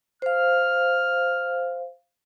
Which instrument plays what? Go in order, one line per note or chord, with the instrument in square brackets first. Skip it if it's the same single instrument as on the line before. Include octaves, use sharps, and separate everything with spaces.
[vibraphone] C5 F5 [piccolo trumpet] F6